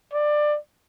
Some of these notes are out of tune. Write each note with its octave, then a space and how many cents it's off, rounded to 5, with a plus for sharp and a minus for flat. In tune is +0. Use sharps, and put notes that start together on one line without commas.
D5 +20